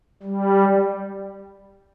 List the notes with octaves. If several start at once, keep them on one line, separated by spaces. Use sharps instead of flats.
G3